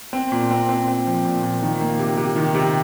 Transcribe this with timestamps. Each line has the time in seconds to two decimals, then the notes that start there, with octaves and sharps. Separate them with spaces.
0.13 C4
0.32 A#2
0.51 C4
0.69 C4
0.88 C4
1.07 F3
1.25 A#2
1.43 A#2
1.63 D#3
1.81 A#3
1.99 C3
2.17 C3
2.36 D#3
2.55 C3